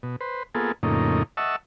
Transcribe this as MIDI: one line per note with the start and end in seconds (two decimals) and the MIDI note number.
0.03 0.16 47
0.21 0.43 71
0.21 0.43 72
0.55 0.72 58
0.55 0.72 59
0.55 0.72 65
0.55 0.72 68
0.55 0.72 69
0.83 1.23 41
0.83 1.23 45
0.83 1.23 49
0.83 1.23 58
0.83 1.23 63
1.37 1.56 75
1.37 1.56 76
1.37 1.56 78
1.37 1.56 81
1.37 1.56 85
1.37 1.56 88